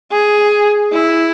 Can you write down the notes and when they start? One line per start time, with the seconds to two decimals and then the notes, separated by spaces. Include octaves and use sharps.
0.12 G#4
0.92 E4